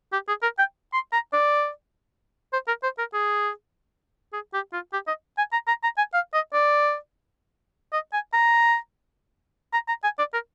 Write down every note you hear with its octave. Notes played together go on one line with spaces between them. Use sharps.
G4
G#4
A#4
G5
C6
A#5
D5
C5
A#4
C5
A#4
G#4
G#4
G4
F4
G4
D#5
G#5
A#5
A#5
A#5
G#5
F5
D#5
D5
D#5
G#5
A#5
A#5
A#5
G#5
D5
A#4